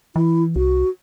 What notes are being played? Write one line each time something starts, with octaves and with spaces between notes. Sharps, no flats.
E3 E4
C2 F#4